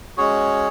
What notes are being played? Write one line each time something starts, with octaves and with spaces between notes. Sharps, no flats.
G#3 C#4 F#4 G#4 C#5